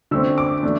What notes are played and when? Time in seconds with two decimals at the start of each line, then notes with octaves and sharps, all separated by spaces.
0.11 D3 A3 C4 E6
0.38 D6
0.63 E3 A3 D4